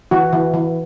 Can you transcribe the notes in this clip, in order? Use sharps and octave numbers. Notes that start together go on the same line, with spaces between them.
E3 F#4
E3
E3